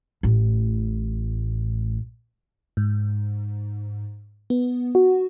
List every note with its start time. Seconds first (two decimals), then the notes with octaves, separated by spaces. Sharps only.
0.23 A1 A2
2.77 G#2
4.50 B3
4.95 F#4